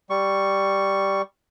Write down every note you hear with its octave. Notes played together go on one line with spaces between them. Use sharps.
G3 C#6